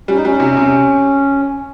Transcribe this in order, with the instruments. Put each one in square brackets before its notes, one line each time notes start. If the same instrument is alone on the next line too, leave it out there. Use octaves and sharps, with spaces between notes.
[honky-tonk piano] G3 [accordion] C#4
[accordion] D#4
[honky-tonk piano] G3 [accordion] C#4
[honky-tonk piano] C3
C3